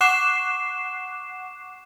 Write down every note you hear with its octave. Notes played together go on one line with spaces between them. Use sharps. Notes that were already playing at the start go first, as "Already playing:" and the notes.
F#5 C#6 D6 F#6 C7 E7